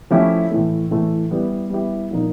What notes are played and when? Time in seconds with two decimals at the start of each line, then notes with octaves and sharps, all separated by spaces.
0.11 F3 A3 C#4 E4 G4
0.51 A2 E3 A3
0.91 A2 E3 A3
1.31 G3 B3 E4 G4
1.70 G3 B3 E4 G4
2.11 A#2 F3 A#3 D#4